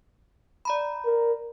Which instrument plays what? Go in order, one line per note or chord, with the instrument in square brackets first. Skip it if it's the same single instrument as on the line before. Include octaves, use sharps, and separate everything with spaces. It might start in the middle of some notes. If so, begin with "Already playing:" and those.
[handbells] D5 A#5 B5
[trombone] A#4